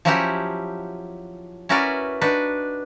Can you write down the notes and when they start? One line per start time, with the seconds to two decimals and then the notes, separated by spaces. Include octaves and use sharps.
0.05 F3 F#3 C#4 E4 F#4 G4
1.69 C#4 E4 F#4 A#4 B4 D5
2.21 D4 D#4 F#4 B4